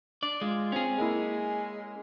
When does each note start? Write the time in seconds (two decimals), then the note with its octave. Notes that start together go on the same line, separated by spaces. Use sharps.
0.23 D4 D5
0.41 G#3 F4
0.72 C4 C#4 G#4
0.98 G#3 A#3 E4